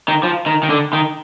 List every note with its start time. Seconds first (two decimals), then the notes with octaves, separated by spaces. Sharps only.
0.08 D#3
0.23 F3
0.46 D#3
0.63 D#3
0.70 D3
0.93 D#3